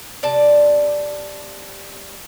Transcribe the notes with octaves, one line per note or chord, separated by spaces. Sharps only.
C3 D5 A5